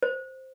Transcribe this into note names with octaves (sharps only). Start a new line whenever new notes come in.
C5